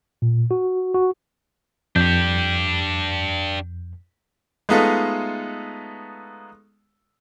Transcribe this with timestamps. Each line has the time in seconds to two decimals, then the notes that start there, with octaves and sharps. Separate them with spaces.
0.22 A#2
0.51 F#4
0.94 F#4
1.96 F2 D4 G4 G6
4.69 G#3 A3 B3 D#4 F4 A4